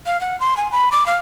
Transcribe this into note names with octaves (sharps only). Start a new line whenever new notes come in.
F5
F#5
C6
G#5
B5
D6
F5